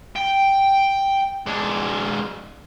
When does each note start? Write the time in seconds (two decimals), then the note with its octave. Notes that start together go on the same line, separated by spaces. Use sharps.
0.16 G5
1.46 G#3 D4